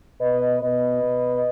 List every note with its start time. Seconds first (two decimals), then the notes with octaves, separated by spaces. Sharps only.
0.21 B2 B4 D#5
0.61 B2 B4 D#5
1.03 B2